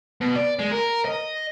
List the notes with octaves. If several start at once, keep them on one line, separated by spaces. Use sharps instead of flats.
B2
D5
G#3
A#4
D#5